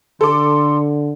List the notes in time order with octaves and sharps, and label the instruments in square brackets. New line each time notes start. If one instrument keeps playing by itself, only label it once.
[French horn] D3 [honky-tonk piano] A4 D6 [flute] C6